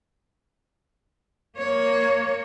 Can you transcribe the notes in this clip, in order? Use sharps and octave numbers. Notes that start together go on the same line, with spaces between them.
A#3 C#5